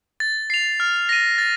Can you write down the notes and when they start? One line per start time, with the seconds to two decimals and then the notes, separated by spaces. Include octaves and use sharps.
0.20 A6
0.50 C7 F7
0.80 F6
1.09 A#6 D#7
1.38 A6